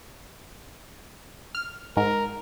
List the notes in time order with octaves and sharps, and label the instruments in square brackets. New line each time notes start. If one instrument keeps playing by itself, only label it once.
[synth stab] F6
[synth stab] G#2 [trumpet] A#4